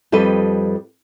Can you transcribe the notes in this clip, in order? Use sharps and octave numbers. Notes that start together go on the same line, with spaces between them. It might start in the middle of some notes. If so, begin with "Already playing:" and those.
F2 G3 A4 B4 D#5